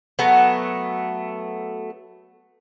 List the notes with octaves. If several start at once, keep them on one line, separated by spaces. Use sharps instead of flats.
F#3 A3 B3